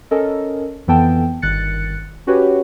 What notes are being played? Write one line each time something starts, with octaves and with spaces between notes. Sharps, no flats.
C#4 A4 A#4 D#5
F2 E3 B3 A4 G5 A5
G1 D#3 F#6 A6 C#7
C#4 F#4 G4 B4 C#5